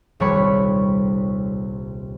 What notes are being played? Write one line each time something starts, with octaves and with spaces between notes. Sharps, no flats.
D#1 C2 G3 C#5 B5 C#6